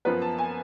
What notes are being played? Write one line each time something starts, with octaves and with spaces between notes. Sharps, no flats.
F#2 F3 B3 B4
A5
G#5